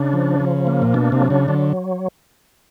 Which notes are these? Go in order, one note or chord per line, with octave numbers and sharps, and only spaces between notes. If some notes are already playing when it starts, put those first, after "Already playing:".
Already playing: C#3 D4
F3
F3
A#3
A#2
B2 D4
C3
F#3
C#3
D3 F#3